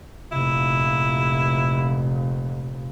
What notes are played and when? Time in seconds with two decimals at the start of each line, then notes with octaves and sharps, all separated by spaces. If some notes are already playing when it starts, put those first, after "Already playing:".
0.32 F1 A#2 E4